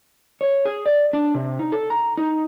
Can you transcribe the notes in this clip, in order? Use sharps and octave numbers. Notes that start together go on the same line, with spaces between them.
C#5
G#4
D5
D4
C3
D#4
A4
A#5
D#4